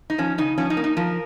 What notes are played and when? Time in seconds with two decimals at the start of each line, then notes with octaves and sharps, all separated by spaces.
0.10 D#4
0.18 F3 C#4
0.38 C#3 D#4
0.58 F3 C#4
0.70 D#4
0.77 A#3
0.84 D#4
0.97 F3 A#4